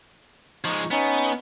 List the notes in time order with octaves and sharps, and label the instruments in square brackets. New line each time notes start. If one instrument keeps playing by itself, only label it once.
[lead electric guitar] F3 G#3 [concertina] D#4 C#6
[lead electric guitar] B3 [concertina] C#4 D#4